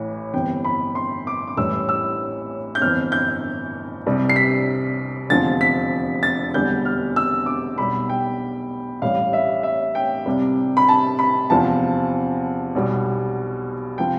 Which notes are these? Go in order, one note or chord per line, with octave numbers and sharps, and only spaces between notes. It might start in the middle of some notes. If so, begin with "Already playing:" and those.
Already playing: A1 A2 E3
G1 F2 E3 G5
B5
C6
D6
D6
A1 A2 E3 G3 E6
E6
G6
G1 F2 E3 F6
G6
C2 C3 G3
C7
B6
F1 E2 D3 F3 A6
B6
A6
E1 E2 D3 G3 G6
F6
E6
D6
B1 B2 G3 B5
G5
A1 A2 G3 F5
E5
E5
G5
C2 C3 G3
B5
A5
B5
E2 C3 F3 A5
B1 B2 G3
C3 F3 G5